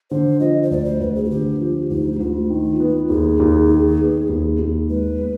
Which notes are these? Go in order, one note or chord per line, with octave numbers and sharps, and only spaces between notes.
D3 C5
F3 D#5
C5
D2 D5
C5
D2 B4
G#4
F4
D3 G4
F3
D2 D#4
G4
D2 F4
D#3
B3
D#2 G#4
D#2
D#3
B3
D#2
D#2
G#3 B4
B3